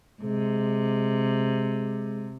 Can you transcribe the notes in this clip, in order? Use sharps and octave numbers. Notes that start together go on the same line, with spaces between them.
C3 G#3